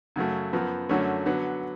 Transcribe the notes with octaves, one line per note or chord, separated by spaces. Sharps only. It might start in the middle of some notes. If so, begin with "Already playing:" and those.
F#2 C#3 F#3 A3
F#2 F3 B3
F#2 D3 F#3 A3 C#4
D3 F#3 B3